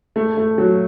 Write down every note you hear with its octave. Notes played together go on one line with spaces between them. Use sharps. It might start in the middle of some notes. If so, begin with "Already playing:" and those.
A3
A3
F#3